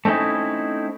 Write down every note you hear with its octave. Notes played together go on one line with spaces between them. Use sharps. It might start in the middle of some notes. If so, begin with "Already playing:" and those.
A3 C4 C#4 D#4 E4